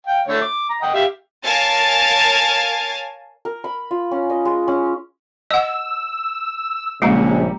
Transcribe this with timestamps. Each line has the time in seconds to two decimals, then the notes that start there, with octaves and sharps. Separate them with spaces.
0.07 F5 G5
0.28 D3 A3 C#5
0.42 D6
0.70 A#5
0.82 D#5 F#5 G5
0.94 G4 E5 F5
1.43 A#4 C#5 F5 G#5 A5 A6
3.45 A#4
3.64 B5
3.91 F4
4.11 C#4
4.30 D#5
4.45 G#3
4.68 C#4
5.51 D#5 F#5 E6
7.02 A#1 C#3 G3 G#3 A#3 A#5 E6 C#7